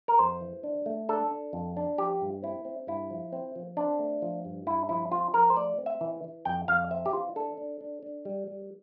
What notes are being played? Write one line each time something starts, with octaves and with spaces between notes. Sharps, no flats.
A#4
F2 C5
E3
D4
A3
D4 A4
D4
F2
D4
F3 G4
G2
C4 E4
C4
G2 E4
F3
C4
F3
C4 D4
A3
F3
G2
G2 E4
F3 E4
C4 F4
F3 A#4
C5
A3 D5
C4
E5
E3
E3
F2 G5
F2 F5
C4 E5
G4
E3 F4
D4 A4
D4
D4
D4
G3
G3